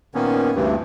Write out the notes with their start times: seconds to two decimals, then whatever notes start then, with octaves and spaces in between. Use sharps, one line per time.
0.15 A#2 D#3 A#3 B3 C#4
0.55 D2 G2 C3 E3